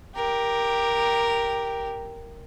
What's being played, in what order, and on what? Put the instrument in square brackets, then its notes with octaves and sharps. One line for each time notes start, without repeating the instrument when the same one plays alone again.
[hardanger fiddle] G4 A#4